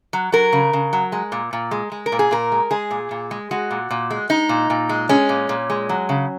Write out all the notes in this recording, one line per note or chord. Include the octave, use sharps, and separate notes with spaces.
F#3
F#3 A#4
C#3
C#3
F#3
G#3
A#2
A#2
G#3
G#3
A#4
A#2
G#4
A#2 A#4
G#3
G#3 G#4
A#2
A#2
G#3
G#3 F#4
A#2
A#2
G#3
G#3 D#4
A#2
A#2
G#3
G#3 C#4
A#2
A#2
G#3
F#3
C#3